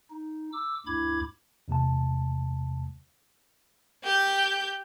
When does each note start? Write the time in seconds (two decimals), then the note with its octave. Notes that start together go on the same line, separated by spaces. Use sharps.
0.11 D#4
0.53 D6 E6
0.86 D2 G2 E4 B5 D6 G#6
1.68 E2 C3 A3 A5
4.04 G4 G6